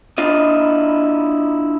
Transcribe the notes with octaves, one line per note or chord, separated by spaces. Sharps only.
D4 E4 F4 D#5